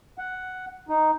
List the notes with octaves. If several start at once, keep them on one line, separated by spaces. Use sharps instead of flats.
F#5
D#4